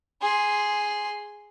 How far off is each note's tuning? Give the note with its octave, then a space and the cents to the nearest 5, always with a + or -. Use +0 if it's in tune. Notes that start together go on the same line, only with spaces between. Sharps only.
G#4 +0 C6 +0